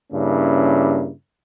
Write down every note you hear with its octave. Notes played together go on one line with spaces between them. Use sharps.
G2 C#3 A#3 C#4 E4